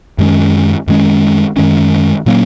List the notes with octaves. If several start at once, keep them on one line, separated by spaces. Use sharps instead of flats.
F#2 D#3 G#3 C#4
F#2 D#3 G#3 C#4
F#2 D#3 G#3 C#4
A#2 F#3 A#3 C#4